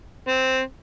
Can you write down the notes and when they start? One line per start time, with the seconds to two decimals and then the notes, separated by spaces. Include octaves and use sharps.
0.29 C4